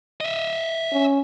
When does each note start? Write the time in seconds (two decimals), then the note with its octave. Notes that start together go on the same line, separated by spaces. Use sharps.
0.21 D#5 E5
0.92 C#4